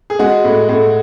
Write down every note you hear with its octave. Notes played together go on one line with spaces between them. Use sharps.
G#4
G#3 F#4
A2
A2